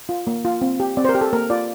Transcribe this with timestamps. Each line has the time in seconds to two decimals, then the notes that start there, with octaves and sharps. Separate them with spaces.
0.09 F4
0.27 A#3
0.45 F4
0.62 C4
0.80 G4
0.97 C4 D5
1.05 C5
1.09 A#4
1.15 G4
1.21 A4
1.33 A#3 A#4
1.50 F4 D5